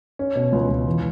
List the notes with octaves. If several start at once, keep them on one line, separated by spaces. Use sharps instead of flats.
C#4
B2
C#2
C#2
E2